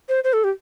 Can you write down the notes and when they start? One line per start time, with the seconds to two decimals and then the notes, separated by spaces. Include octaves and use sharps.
0.09 C5
0.24 C5
0.33 A4
0.44 G4